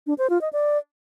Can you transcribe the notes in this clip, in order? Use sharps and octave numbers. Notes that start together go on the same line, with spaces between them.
D4
C5
F4
D#5
D5